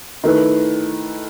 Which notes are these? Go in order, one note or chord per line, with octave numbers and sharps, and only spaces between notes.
D#3 A3 E4 B4